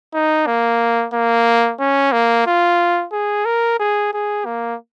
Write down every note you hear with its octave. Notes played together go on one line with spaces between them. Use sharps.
D#4
A#3
A#3
C#4
A#3
F4
G#4
A#4
G#4
G#4
A#3